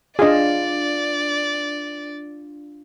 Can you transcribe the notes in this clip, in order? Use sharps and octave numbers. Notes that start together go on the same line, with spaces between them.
D4 F4 G#4 D5 D#5